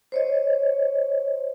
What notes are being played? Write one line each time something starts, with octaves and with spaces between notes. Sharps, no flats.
C5 C#5 D#5